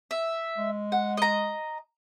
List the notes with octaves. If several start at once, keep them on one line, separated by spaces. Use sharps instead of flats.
E5
G#3
F#5
D#5 A#5